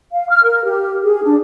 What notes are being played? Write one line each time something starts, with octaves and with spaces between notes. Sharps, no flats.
F5
F6
A#4
G4
G#4
D4